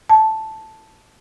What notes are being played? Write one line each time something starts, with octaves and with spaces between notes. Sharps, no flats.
A5